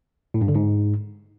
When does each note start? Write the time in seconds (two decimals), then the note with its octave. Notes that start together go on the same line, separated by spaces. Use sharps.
0.34 A2
0.41 G2
0.48 D3
0.55 G#2